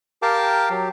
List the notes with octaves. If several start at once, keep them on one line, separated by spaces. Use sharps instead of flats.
G4 A#4 F5 G5 A5 D6
F#3 G4